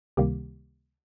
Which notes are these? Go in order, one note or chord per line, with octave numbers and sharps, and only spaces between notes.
C#2 C3 D#3 G3 A#3 G4